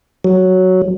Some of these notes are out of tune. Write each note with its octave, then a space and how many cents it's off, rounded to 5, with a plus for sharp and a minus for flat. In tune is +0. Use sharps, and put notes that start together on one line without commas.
F#3 +5